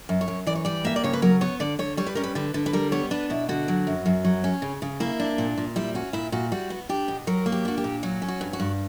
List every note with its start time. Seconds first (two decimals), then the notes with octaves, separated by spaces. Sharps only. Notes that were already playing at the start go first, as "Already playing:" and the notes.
0.09 F#2
0.21 C#5
0.28 F#2
0.47 E3 D5
0.55 C#5
0.65 G3 D5
0.85 A#3 E5
0.96 D5
1.04 C#3 C#5
1.13 B4
1.22 F#3 A#4
1.41 B3 C#5
1.60 D3 D5
1.79 D3 C#5
1.97 G3 C#5
2.07 B4
2.15 C#4 A#4
2.24 B4
2.35 D3 B4
2.54 D3
2.66 B4
2.73 G3 A#4
2.92 B3 C#5
3.11 D4 B4
3.30 B2 E4
3.49 D3 F#4
3.68 F#3
3.87 F#2
4.06 F#2
4.25 F#3
4.44 C#4
4.62 C#3
4.82 C#3
5.00 A#3 E4
5.20 D4
5.38 A#2
5.57 A#2
5.76 G3 E4
5.95 C#4 F#4
6.13 A#2 E4
6.32 A#2 F#4
6.52 G3 F#4
6.70 B3
6.89 D4 G4
7.08 B2
7.27 F#3 A#4
7.46 A#3
7.52 G4
7.65 D4 F#4
7.78 G4
7.84 A#2
8.03 F#3 F#4
8.22 C#4
8.28 F#4
8.41 G2
8.53 F#4
8.60 G2